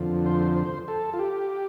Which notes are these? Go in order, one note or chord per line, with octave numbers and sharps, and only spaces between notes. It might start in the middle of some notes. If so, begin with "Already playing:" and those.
Already playing: F2 D3 F3
C5
C5
A4
F4
G4